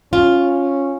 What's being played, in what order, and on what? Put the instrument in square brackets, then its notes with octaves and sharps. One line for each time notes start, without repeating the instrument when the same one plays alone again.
[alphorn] C#4 [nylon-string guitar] F4